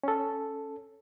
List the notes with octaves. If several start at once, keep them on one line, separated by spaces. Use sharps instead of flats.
C#4 A4